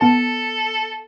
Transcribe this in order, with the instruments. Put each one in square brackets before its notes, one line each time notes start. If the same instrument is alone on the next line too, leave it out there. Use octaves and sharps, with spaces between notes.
[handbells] B3 A5 [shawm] A4